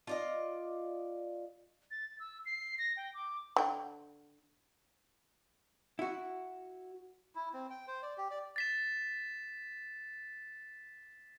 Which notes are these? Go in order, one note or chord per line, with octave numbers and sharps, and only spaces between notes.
F4 D5 D#5
A6
E6
C7
A#6
G5
D6
D3 G5
E4 F#4
E4
C4
G5
C5
D5
G4
D5
A6 B6 E7